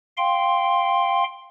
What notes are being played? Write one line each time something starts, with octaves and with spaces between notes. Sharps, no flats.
F5 G5 C6